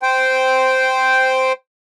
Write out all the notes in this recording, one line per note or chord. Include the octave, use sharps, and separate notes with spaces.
C5 G5